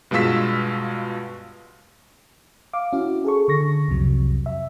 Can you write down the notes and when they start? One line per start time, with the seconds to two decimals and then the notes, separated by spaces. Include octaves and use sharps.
0.11 G2 B2 G#3 F4 E6 B6
2.73 F5 D6
2.93 C#4 E4 F#4
3.25 G#4 A4 C#6
3.48 D3 C#6 A#6
3.88 C2 F2 C3 F#3
4.46 E5